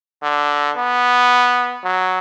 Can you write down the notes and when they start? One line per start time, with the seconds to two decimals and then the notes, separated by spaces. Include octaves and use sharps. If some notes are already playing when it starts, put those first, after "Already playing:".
0.23 D3
0.77 B3
1.84 F#3